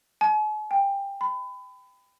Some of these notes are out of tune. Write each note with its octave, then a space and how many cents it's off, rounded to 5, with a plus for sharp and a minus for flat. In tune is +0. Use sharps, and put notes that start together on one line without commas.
G#5 +45
G5 +20
B5 +30